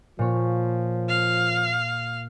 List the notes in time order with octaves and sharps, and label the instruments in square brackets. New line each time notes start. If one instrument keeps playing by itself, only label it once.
[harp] A#2 C#5 [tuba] F3
[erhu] F5